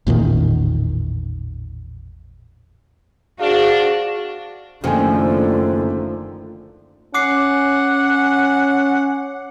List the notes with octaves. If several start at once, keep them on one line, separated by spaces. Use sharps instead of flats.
A1 E2 A#2 D#3
D4 F#4 G#4 C5 F5
F#1 D#2 D3 D#3 F3 A3 G5 G#5
C#4 F#5 D6 C7